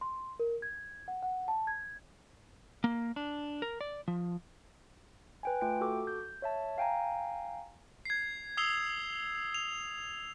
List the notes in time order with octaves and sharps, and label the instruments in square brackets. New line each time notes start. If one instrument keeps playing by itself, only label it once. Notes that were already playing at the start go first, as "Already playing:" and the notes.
[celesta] C6
A#4
G#6
F#5
F#5
A5
G#6
[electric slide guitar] A#3
D4
A#4
D5
F3
[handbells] B4 G5 G#5
A3 F4 G5 D7
F#4 A4 D6
G6
C#5 E5 A5
F5 G5 G#5 A#5
[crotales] G#6 C7
D#6 E6 C7 F7 G7
F7